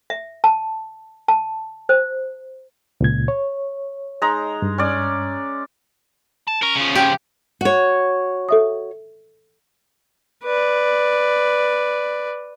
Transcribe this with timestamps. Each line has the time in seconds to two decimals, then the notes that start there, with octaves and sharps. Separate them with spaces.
0.10 E5
0.44 A5
1.28 A5
1.89 C5
3.01 C#2 A#2 G#6
3.28 C#5
4.22 G#3 D#4 A#5
4.62 G2
4.78 C#4 D5
6.48 A5
6.63 C#4 A#4
6.76 C#3 F3
6.95 G4
7.61 F#4 C#5
8.49 A4 E5 D#6
10.44 B4 D5